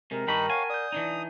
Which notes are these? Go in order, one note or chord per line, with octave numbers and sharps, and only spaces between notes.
C3 G#3 A#4
G2 D#3 D#4 G5 A5 B5 C#6
C#5 F5 F#5 G#5
D5 D#6 G6
E3 D4 D#4